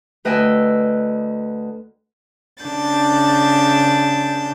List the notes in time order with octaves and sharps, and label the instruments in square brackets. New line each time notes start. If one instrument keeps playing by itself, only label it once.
[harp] D2 B4 D#5 G5 G#5 E6
[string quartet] C#3 D4 G6 A6